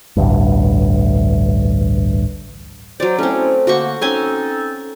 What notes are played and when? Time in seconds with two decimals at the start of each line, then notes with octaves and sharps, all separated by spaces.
0.17 A1 D2 G2
3.00 F#3 C5 D5
3.18 A3 C4 C#4 E4
3.67 D3 A#3 F#4 C5 C#6
4.01 C4 C#4 D#4 A4 G#5 C6